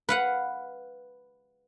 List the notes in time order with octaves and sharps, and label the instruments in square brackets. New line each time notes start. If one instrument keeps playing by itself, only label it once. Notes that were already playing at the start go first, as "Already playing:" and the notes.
[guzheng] B4 F5 F#5